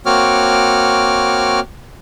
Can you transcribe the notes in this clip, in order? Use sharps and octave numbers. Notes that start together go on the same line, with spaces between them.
A#3 C4 F#4 C#5 D6 F6